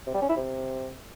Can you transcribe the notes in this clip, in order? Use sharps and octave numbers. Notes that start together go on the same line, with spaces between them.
C3
G3
C#4
E4
C3